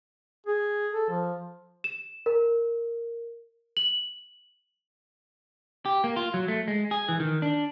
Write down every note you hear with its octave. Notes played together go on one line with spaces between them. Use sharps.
G#4
A4
F3
E7
A#4
F#7
G4
A#3
F4
F#3
A3
G#3
G#4
E3
D#3
D4